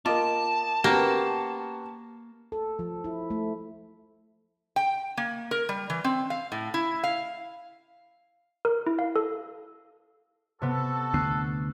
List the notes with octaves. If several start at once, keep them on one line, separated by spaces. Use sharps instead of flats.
A#3 F4 D#5 A5 D6
A#3 B3 C#4 F#4 G4
A4
F3
E4
A3
G5
A#3
A#4
G3
E3
C4
F5
A2
E4
F5
A#4
E4
F5
A4
C3 B3 F#4 A4
D2 D3 B3 F#6 C7